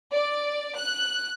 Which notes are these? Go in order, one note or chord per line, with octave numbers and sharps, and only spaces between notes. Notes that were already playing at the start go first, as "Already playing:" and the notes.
D5
F#6